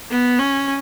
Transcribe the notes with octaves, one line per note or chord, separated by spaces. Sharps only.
B3
C#4